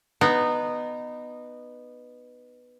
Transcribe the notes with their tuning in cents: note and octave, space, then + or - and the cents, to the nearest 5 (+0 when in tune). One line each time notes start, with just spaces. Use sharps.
B3 +0 D#4 -20